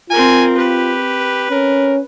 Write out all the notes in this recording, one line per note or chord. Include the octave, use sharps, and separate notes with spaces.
C4 F4 A#4 G#5
G4 B4
C#4 A#4